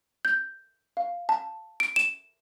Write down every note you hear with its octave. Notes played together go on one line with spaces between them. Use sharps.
G6
F5
A5
D7
E7